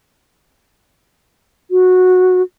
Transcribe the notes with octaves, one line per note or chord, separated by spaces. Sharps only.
F#4